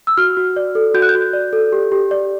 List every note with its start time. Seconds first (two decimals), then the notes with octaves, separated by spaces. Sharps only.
0.07 E6
0.17 F#4 F6
0.37 F#4
0.56 D5
0.75 A4
0.94 F#4 G6
1.02 F#6
1.09 G6
1.15 F#4
1.33 D5
1.53 A4
1.72 G4
1.92 G4
2.11 D5